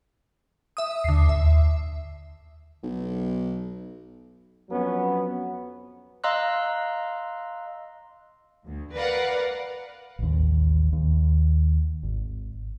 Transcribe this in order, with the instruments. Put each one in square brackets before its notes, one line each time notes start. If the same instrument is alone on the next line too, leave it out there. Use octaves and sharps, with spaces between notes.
[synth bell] E5 D#6
[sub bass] D#2 [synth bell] D3 C7
[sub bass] D#2 [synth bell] E5
[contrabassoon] B1
[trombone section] F2 F#3 B3 C#4
[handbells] D#5 F5 A#5 C6 E6 F#6
[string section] D2
A#4 B4 D5 F5 F#5
[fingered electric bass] A1 D#2
D#2
G#1